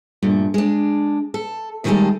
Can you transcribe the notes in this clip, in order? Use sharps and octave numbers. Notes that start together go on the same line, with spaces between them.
G2 A#2 A3
G#3 D4
A4
C3 D#3 G3 G#3 G#4 A4